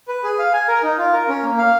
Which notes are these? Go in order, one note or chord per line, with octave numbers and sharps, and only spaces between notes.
B4
G#4
F5
G#5
A#4
D#4
F4
A#4
C#4
A#3
F5